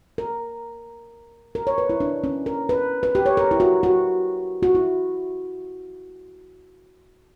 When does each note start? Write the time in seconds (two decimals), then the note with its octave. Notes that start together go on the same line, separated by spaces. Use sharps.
0.18 A#4
1.55 A#4
1.67 C#5
1.78 B4
1.90 E4
2.00 D4
2.24 C#4
2.46 A#4
2.69 B4
3.03 B4
3.15 G4
3.26 C#5
3.37 A#4
3.51 E4
3.60 F#4
3.83 F#4
4.63 F#4
4.75 E4